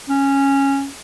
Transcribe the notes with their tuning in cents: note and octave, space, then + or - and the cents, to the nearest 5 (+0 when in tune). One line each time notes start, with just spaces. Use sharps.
C#4 -10